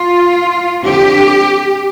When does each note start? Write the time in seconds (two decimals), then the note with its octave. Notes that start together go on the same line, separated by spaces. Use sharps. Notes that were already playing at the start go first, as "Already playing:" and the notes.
Already playing: F4
0.84 F2 D3 G4